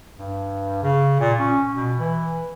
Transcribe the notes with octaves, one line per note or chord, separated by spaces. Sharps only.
G2
C#3
A#2
C#4
B2
E3